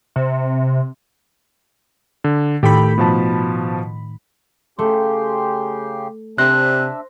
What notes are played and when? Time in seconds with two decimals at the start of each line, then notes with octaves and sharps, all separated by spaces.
0.16 C3
2.24 D3
2.63 A2 D#3 G4 A4 G5 B5
2.98 B2 F3 A5
4.79 C#3 A3 G4 C6
6.38 C3 D4 C5 E5 F#6 A#6